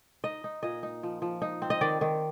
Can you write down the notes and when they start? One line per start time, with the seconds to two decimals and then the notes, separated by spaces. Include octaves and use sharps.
0.24 D#4 D#5
0.44 D#4
0.63 A#2 D#5
0.83 D#4
1.03 F3
1.22 F3
1.42 D#4
1.62 C4
1.70 D#5
1.81 D#3 D5
2.01 D#3